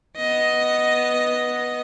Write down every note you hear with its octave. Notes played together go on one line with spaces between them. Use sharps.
B3 D#5